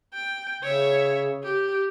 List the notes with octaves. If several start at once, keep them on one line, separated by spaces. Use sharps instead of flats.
G5
C#3 C#5 E5
G4